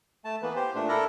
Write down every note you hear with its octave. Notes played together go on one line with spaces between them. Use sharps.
A3 A5
E3 A#3 B3 B4
G4 C5
A#2 A3 D4
E4 A4 A#4 D5 A#5